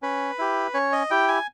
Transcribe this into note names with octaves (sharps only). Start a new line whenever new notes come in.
C#4 B4
E4 G4
C#4 C#5
D#5
E4 G4 G5
G#5